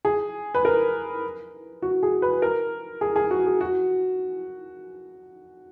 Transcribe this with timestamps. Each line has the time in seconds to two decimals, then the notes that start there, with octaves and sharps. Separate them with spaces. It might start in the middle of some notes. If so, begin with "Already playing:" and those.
0.05 G#4
0.54 B4
0.65 A#4
1.82 F#4
2.03 G#4
2.22 B4
2.42 A#4
3.01 G#4
3.16 G#4
3.31 F#4
3.46 G#4
3.61 F#4